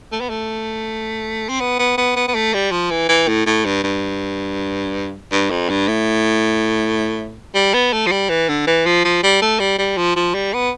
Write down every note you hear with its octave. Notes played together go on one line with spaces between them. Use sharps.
A3
B3
A3
C4
B3
B3
B3
B3
B3
A3
G3
F3
E3
E3
A2
A2
G2
G2
G2
F2
G2
A2
G3
B3
A3
F3
G3
E3
D3
E3
F3
F3
G3
A3
G3
G3
F3
F3
G3
B3